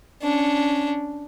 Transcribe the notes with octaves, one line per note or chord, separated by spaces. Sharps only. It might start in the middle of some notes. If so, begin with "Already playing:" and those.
C#4 D4